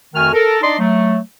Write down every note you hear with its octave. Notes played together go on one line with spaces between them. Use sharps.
F2 D#3 A3 F#4 G#5 F6
A4 A#4
D4 D#4 D5 D#5 C6
F#3 A3